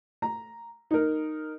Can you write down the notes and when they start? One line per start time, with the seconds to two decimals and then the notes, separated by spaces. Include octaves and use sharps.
0.22 A#5
0.91 D#4 A#4